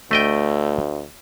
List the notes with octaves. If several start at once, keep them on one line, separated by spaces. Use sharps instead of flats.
D2 A3 D#5 G5